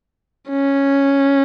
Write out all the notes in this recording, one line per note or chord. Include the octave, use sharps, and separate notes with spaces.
C#4